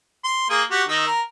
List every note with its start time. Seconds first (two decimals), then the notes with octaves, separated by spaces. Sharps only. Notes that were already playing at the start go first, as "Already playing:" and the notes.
0.24 C6
0.50 A#3 G#4
0.71 F#4 G4
0.88 D#3 D#4 E6
1.06 A#4